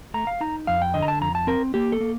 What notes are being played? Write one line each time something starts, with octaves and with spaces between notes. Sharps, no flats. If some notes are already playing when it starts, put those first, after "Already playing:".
A3 A#5
F5
D#4 A#5
F2 F5
G5
D3 D#5
A#5
A5
F2 A#5
A5
C4 A#4
A#3 G4
A4
A#3